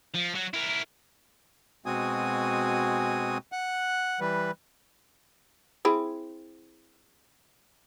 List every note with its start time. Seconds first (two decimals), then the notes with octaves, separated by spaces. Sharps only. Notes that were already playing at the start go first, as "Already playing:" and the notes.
0.15 F3
0.35 F#3 F#4
0.54 E4 A#4
1.86 B2 G#3 C4 F#4 G#5 D#6
3.52 F#5 F#6
4.20 E3 G3 B4
5.85 C4 E4 G#4